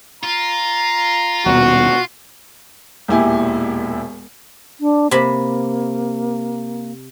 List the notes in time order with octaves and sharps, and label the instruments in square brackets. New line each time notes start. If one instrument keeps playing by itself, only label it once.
[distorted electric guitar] F4 [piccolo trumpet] A#5
[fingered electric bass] D#1 B2 [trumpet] F#4
[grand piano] E1 D#2 A#2 E4 G4 G#5
[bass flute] D4
[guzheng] C3 B5 [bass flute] A#3